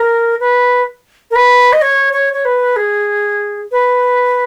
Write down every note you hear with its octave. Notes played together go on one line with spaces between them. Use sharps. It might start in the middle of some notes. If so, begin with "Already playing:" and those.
Already playing: A#4
B4
A#4
B4
D#5
C#5
C#5
C#5
B4
G#4
B4